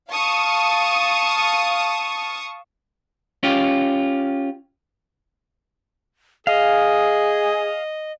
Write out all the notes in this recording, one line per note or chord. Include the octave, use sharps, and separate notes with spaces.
F5 A5 C#6 D#6
C#4 F4 G4
G#4 D#5 F5